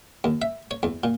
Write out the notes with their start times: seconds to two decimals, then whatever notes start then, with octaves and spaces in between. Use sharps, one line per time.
0.24 D#2
0.42 E5
0.71 C#5
0.83 E2
1.04 A#2